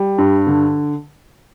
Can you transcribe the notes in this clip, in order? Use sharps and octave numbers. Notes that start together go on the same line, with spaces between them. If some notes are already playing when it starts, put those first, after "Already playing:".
Already playing: G3
G2
D3